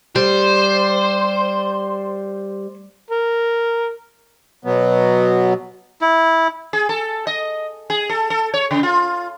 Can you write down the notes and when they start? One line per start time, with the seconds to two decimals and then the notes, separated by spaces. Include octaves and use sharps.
0.16 G3 C5
3.10 A#4
4.65 B2 F#3 B3
6.01 E4
6.73 G#4
6.89 A4
7.27 D#5
7.90 G#4
8.09 A4
8.30 A4
8.54 C#5
8.71 C#3
8.83 F4